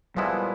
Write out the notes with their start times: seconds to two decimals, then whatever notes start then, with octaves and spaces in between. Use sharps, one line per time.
0.17 A#2 F3 G3 G#3 B3 E4